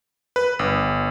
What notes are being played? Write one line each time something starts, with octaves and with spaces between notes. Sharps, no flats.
B4
G1